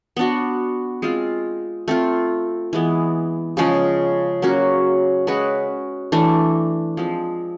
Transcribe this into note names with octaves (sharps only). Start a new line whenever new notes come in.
B3 D4 F#4
G#3 C4 F4
A3 C4 F4
E3 G#3 B3
C#3 F3 G#3 C#4
F#3 A#3 C#4 F#4
G#3 C#4 F#4 B4
E3 A3 D4
F3 G#3 C4